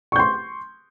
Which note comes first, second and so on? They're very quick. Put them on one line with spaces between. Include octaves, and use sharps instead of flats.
C#6 G6 C6